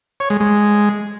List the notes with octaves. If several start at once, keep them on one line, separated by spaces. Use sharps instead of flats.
C#5
G#3
G#3